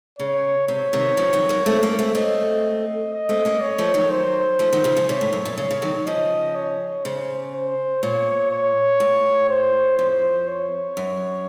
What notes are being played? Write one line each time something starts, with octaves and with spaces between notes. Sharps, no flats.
C#3 C#5
C3 C#5
C3 D#3
C#3 F3
D#3 F#3
F#3 A#3
A3 C4
A#3 C#4
A3 C4
A3 C4 D#5
D#5
A3 C4
A#3 C#4
C#5
F3 A3
D#3 F#3
C5
F3 A3
D#3 F#3
C#3 F3
C#3
C3 C#5
A2
F#2
A#2
C#3 C#5
C#3
D#3 F#3
C#3 F3 D#5
C#5
C#3 C5
C5
A#2 C#5
C#5
A2
C5
F2 C5
C#5
F#2